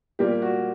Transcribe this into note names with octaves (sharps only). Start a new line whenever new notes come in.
A#2 G3 A#3 G4
F#4